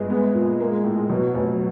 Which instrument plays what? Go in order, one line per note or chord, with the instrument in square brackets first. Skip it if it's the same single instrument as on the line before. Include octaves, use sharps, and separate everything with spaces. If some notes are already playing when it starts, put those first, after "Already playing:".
Already playing: [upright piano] G1 [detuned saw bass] G#3
[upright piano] B3
A#2
A#3
A2
[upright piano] B2 [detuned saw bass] F#3
[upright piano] F1